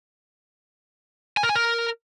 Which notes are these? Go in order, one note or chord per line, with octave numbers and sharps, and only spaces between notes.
G#5
A#4
G#5
A#4